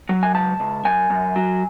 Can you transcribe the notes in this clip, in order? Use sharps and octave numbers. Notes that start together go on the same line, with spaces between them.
F#3
G#5
C#2 A5
C#2
F#2 G#5
F#2
F#3